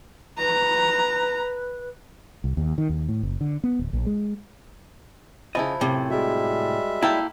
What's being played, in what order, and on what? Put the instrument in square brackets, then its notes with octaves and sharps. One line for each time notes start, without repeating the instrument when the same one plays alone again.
[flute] B4 [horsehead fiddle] A#5
[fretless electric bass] C2
D#2
D#3
D#2
A2
F#1
D3
B3
D1
A#1
G#3
[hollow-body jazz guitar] C#3 D#5 [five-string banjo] F3 E4 [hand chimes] C5 A5 B5
[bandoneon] F#2 [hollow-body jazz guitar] A2 C3
[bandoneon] G3 G#3 E5 [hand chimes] F#4 G#4
[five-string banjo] A#3 A4 G5 [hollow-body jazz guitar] E4